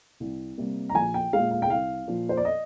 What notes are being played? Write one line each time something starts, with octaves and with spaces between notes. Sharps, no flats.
C2
C3 G3 A#3
A#5
A#1 G#5
G5
A#2 G#3 F5
F5
G5
C2 F5
A#2 F3 A#3
C5
D5
D#5